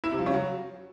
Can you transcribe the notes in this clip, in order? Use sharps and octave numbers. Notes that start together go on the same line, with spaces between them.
E4
C3
F3
C#3
F#3